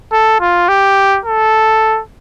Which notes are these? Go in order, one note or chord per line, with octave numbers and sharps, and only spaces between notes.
A4
F4
G4
A4